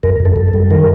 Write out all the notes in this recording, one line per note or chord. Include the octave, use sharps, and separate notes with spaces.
F#2 A#4
F#2
A4
F#2
A4
G3
D#3 A#4